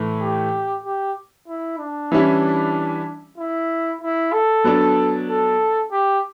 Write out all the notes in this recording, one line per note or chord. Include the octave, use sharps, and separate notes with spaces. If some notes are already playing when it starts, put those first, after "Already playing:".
Already playing: A2 E3 A3
G4
G4
E4
D4
E3 G3 C#4 E4
E4
E4
A4
F#3 B3 D4
A4
G4